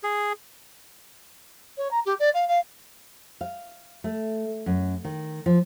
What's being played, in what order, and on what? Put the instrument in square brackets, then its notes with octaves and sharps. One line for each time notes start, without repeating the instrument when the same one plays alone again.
[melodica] G#4
[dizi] C#5
A#5
G4
D5
F5
F5
[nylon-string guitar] F5
A3
F#2
D#3
F3